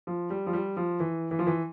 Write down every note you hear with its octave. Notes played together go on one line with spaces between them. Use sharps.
F3
G3
F3
G3
F3
E3
E3
F3
E3